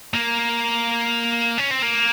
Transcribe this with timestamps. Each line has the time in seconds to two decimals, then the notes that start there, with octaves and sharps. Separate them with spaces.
0.14 A#3
1.58 C#4
1.71 C4
1.82 A#3